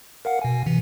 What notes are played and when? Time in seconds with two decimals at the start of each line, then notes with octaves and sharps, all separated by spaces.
0.25 A#4 F5 F#5
0.42 B2 G#5
0.66 C3 E3